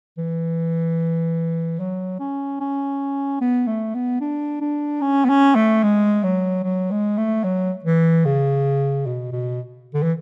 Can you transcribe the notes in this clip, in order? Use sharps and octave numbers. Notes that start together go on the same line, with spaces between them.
E3
F#3
C#4
C#4
B3
A3
B3
D4
D4
C#4
B3
C#4
A3
G#3
F#3
F#3
G#3
A3
F#3
E3
C#3
B2
B2
D3
E3